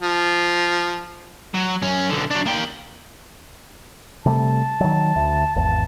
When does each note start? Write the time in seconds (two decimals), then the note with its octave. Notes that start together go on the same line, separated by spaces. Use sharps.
0.02 F3
1.54 F#3
1.82 F#2 C#4
2.10 B1 D3
2.31 F#3 D4
2.46 A#3 G5
4.26 C3 G3 A3 A5
4.81 D#3 F#3
5.16 D2
5.56 G#1 E2 A5